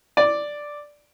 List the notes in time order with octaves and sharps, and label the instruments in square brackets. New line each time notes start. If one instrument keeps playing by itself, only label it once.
[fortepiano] D5